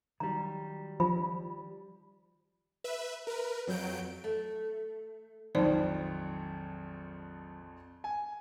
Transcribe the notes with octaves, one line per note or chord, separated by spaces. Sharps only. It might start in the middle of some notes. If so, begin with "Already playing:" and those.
D#3 F#3 G3 A#5
F3 F4 B5
B4 E5
A#4 B4
F2 F#3 G6 D7
A3
A#1 F2 D#3 F#3 D#4 C5 D5
G#5